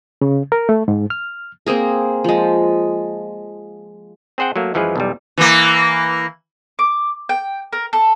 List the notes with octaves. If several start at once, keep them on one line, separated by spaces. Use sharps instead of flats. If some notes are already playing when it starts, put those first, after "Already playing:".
C#3
A#4
A3
G#2
F6
A#3 C4 G#4 A#4
F3 G#3
C4 G#4 C5 F#5 G5
F#3 A3 A#3
F#2 E3 F3 G#3 G#4 B4
B1 E2 G3
E3 A#3
D6
G5
A#4
A4